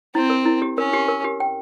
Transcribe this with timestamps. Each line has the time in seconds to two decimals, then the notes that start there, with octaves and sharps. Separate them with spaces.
0.15 C4 E4
0.30 A#4
0.45 E4
0.62 G4
0.77 C#4 A#4
0.93 G4
1.08 A#4
1.24 G4
1.40 G5